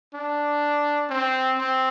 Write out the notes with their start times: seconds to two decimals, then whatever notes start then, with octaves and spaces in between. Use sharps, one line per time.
0.14 D4
1.10 C4
1.59 C4